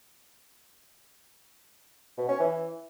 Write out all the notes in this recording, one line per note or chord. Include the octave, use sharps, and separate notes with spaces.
B2
C#4
E3